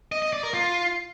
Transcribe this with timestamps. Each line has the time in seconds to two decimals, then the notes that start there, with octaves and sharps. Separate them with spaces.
0.12 D#5
0.22 D#5
0.33 D5
0.43 A#4
0.54 F4